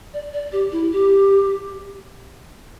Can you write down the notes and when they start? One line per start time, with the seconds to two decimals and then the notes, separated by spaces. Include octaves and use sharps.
0.14 D5
0.33 D5
0.52 G4
0.72 E4
0.92 G4